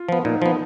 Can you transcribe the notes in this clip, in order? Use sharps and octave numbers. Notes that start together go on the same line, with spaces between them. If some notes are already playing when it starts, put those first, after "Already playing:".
Already playing: F4
F3 B3
A#2 D#4
F3 B3